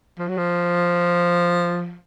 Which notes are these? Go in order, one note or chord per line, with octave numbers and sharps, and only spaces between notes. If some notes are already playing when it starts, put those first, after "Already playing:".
F3
F#3
F3